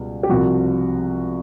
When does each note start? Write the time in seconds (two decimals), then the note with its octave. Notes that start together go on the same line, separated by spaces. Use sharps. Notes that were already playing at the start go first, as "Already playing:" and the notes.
Already playing: C#2 B2 G3
0.23 G4
0.29 C2 C3 F3 F#4